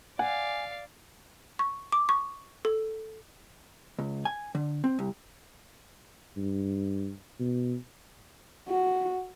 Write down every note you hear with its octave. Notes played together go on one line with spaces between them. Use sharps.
D5 F5 F#5 G#5
C#6
D6
C#6
A4
C#2
G#5
D3
C4
C2
G2
B2
F#4